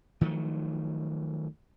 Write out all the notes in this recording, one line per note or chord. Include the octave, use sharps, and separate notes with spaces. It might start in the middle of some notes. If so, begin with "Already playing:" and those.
D#3 F3 F#3 A3